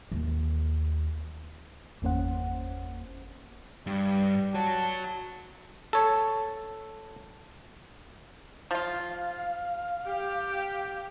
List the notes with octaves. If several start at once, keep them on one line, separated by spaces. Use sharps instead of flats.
D#2
G1 E2 A#3 C#4 C5 F#5
G2 G3
F#4 C#5 A5
A4 C#5
F3 F4 F5
G4